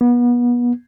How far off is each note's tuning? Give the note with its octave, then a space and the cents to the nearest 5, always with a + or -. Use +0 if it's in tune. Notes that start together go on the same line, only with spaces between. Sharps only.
B3 -30